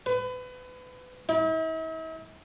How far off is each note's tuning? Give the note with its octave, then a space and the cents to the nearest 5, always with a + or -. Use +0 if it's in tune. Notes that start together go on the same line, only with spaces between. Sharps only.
B4 +30
E4 -45